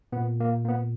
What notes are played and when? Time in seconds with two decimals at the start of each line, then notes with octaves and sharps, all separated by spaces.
0.12 A#2 B3
0.40 A#3
0.65 A#3
0.68 B3